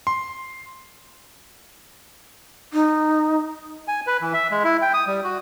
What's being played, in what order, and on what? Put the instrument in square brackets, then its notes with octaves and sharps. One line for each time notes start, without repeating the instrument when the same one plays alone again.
[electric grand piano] C6
[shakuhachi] D#4
[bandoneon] G#5
B4
E3
E5
G#3
E4
G5
D#6
G3
F#4